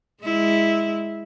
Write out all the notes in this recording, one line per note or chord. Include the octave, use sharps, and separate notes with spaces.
G#3 E4